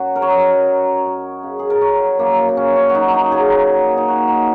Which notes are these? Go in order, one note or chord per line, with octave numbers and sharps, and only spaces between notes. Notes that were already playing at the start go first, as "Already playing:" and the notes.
Already playing: F#2 F#3 F#4
A#4
C#5
F#2 D#5
F#2
F#2
C#3
G#4
A#4
F#3 C#5
F#2 A#3
A#3
A#2 C#4
C#4
F#4
F#3 D#4
D#4
F#3 G#4
A#2
D#4
A#2 F#4
D#4